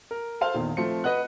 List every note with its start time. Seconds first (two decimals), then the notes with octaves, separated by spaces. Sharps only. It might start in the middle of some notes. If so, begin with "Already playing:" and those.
0.11 A#4
0.41 A4 C5 F5 A5 C6
0.54 E2 A#2 D#3
0.77 F3 A3 C4 C#7
1.04 B4 D#5 F#5 F#6